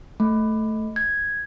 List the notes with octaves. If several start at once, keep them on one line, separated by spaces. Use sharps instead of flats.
A3
G#6